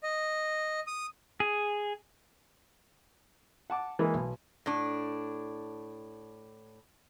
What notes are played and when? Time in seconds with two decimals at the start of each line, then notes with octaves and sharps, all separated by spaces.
0.03 D#5
0.87 D#6
1.40 G#4
3.70 F#5 A5 D6
3.99 E3 G#3 A#3 E4
4.14 B1
4.66 A2 D4